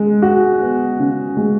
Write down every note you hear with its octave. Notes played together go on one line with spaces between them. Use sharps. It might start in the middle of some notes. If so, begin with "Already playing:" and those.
Already playing: G#3
F#4
B3
C#3
G#3